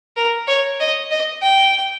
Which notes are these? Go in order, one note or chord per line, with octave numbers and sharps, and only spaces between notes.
A#4
C#5
D#5
D#5
G5